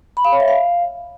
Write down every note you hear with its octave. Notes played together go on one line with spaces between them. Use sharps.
B5
F5
C#5
E5
F5